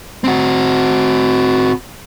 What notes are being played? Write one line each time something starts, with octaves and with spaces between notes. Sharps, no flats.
C4 F#4